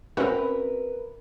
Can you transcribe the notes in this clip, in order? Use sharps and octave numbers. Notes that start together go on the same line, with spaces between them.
C4 C#4 F#4 A#4 B4 E5